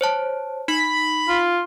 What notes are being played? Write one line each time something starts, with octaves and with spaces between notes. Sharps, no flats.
C5 C#5 A5
D#4 B5
F4